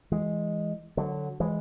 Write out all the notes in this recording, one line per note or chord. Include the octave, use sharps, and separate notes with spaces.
E3 G#3
D3 F#3
E3 G#3